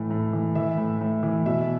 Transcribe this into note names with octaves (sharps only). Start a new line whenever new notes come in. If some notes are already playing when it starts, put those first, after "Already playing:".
Already playing: A2 E3
A2
E3
E3 E5
A2
A2
E3
B2 E5